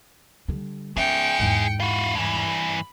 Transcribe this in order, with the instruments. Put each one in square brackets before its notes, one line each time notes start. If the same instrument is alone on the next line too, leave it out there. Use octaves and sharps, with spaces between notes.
[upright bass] D3 G3
[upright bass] C#4 [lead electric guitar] G#4 E5 [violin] G5 C#7
[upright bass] E2 G#2
[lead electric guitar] F4 F#4 [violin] B5
[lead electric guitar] G2 E3